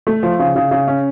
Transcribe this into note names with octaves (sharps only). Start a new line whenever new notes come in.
A3
F3
C#3
C#3
C#3
C#4